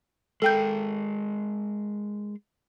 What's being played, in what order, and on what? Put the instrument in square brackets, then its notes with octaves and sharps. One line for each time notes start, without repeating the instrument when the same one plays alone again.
[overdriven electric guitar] G#3 A#4 [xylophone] A4 G5 G6